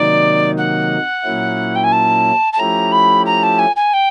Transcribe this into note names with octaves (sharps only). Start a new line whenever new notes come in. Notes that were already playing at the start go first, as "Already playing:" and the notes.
Already playing: C3 D#3 F#3 A#3 D#4 D5
F#5
A#2 F#3 A#3 C#4 E4
G5
G#5
A5
A5
F3 A3 C#4 E4 G4 A#5
B5
A#5
A5
G#5
G#5
G5